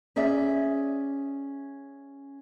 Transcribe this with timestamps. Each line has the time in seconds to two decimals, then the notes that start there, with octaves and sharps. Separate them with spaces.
0.16 C#4 G#4 D5 E5